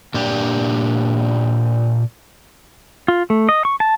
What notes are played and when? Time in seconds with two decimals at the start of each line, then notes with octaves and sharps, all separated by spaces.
0.14 A#2 D4 G4
3.08 F4
3.30 A3
3.49 D#5
3.65 C#6
3.80 A5